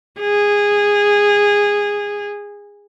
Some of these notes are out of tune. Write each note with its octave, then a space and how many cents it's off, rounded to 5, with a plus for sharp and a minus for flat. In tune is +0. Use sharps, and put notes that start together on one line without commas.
G#4 -15